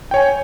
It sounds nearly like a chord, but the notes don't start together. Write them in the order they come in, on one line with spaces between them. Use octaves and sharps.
G5 C#5 G#5